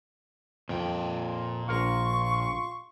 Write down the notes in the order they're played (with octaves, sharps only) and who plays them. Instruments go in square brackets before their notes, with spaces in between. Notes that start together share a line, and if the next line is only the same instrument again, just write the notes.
[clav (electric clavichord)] F2 [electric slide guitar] A#2 G5
[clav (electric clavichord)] A#1 A#4 F5 [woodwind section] F4 C6 C#6